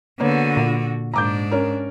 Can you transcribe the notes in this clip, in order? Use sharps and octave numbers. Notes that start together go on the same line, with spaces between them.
D3 A#3 B3 F#4 C#5
A#2
G#2 D4 A#5 D6 G6
C#4 A#4